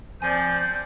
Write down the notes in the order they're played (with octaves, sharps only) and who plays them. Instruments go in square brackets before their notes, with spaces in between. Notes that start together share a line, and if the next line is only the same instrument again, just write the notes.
[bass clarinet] F3 [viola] C4 D5 [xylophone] G#5 [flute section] G6